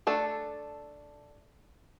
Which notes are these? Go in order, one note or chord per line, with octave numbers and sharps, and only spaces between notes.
A3 D4 A4